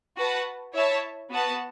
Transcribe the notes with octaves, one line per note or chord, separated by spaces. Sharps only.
F#4 B4 F#5 A5
E4 C#5 E5 A5
B3 F#4 B4 F#5 A5